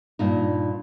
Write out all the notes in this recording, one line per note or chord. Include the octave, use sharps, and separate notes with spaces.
G2 A#2 D#4